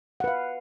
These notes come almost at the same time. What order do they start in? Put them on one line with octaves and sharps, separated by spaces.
F#5 B4 F5